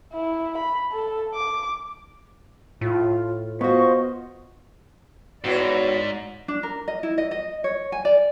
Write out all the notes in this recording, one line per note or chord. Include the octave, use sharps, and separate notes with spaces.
E4
B5
A4
D6
A2 F4
B3 F4 F#4 C5 D#5 C#6
G#2 B3 E4 F#4 C#5 D5
D4
A#4
D#5
E4
D#5
D#5
C#5
G#5
D5